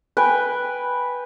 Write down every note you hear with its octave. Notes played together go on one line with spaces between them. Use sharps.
B4 G5 G#5